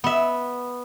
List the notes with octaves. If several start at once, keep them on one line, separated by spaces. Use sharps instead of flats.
B3 E5